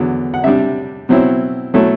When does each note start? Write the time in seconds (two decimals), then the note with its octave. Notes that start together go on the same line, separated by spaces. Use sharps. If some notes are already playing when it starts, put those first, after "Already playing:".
Already playing: E2 D3 F#3
0.34 F#5
0.44 C3 G3 D4 E5
1.09 B2 F#3 C4 E4
1.74 B2 F#3 A3 E4 A4